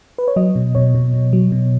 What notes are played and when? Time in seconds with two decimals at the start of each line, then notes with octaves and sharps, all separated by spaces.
0.18 B4
0.28 C#5
0.36 F#3 D#5
0.56 B2
0.75 B2 C#5
0.95 B2
1.13 B2
1.33 F#3
1.52 B2